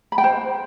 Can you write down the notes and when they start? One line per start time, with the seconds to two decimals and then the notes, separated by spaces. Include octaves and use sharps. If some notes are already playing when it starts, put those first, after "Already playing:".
0.12 B5
0.18 G5
0.24 C5